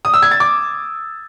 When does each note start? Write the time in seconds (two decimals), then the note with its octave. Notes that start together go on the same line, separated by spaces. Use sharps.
0.05 D#6
0.14 E6
0.22 G#6
0.31 A6
0.40 D6